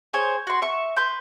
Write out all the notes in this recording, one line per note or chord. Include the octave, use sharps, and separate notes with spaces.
G#4 C5 C#5 G#5
F#4 C6
E5 C#6
B4 C6 G6